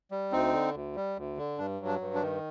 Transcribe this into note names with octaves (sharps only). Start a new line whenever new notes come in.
G3
D2 C4 D#4
D3
D2
G3
D2
D3
G2 D4
F#3
D4
G2
D4
D#3